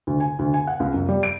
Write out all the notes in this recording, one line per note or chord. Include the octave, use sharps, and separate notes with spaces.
D2
G#5
D2
G#5
F#5
C#2
F#2
G3
D7